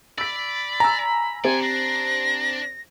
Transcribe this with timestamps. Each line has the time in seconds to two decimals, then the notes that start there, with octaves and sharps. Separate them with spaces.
0.18 D5 B5 E6 B6
0.80 G#5 A#5 E6
1.44 C4 G4 A4 C5 D5 G#5
1.63 D4 A#6